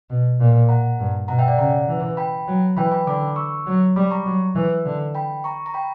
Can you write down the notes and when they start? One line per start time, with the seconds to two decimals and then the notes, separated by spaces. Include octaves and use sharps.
0.10 B2
0.40 A#2
0.69 F#5 A#5
0.99 G2
1.28 B2 F#5 A#5
1.39 E5 G5
1.48 D5 F#5
1.59 C#3 F#5 A#5
1.88 E3
2.17 G5 B5
2.48 F#3
2.77 E3 G5 B5
2.92 G5 B5
3.07 D3 B5 D6
3.36 C#6 E6
3.66 F#3
3.96 G3 B5 D6
4.11 A#5 C#6
4.26 F#3
4.55 E3
4.85 D3
5.15 G5 B5
5.44 A#5 C#6
5.66 A#5
5.74 G5 B5